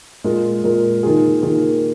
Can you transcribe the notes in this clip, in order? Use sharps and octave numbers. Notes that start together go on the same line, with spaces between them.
A#2 G#3 F4 A#4
A#2 G#3 F4 A#4
D#3 A#3 F4 G#4
D#3 A#3 F4 G#4